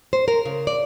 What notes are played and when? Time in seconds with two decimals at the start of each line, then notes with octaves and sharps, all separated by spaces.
0.13 C5
0.28 A#4
0.45 C#3
0.67 D5